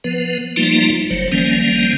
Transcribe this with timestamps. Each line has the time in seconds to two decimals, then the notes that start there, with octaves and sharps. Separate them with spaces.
0.04 F3 B3 B4
0.56 F3 G3 A3 A#3 D#4 F4
1.10 F#1 F#3 C5
1.32 D#3 F3 G3 A#3 C#4